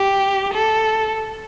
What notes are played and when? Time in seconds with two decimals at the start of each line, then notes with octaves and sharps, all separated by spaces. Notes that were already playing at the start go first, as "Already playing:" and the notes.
Already playing: G4
0.53 A4